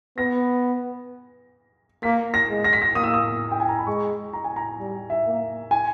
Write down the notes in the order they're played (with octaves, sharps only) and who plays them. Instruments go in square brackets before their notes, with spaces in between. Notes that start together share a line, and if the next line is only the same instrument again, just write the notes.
[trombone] B3 [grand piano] A#6
[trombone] A#3 [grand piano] B6
[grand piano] A#6
[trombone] G#3
[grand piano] A#6
B6
A#6
[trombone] A#3 [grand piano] D#6
[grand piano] E6
D#6
G5
G#5
A#5
B5
[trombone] G#3 [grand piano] C#6
[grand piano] A#5
G#5
A#5
[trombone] G3
[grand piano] E5
[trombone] A#3
[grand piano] G#5